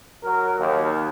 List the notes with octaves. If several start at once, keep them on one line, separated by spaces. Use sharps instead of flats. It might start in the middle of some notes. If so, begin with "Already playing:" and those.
F#3 A#4
D#2